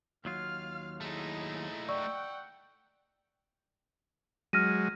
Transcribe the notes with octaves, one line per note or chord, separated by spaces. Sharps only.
D#2 F#3 F4 F5 F6
A3 D#4 E4 G#4
D5 F#5 G5 C#6 E6
F#3 G#3 F6 A#6 D#7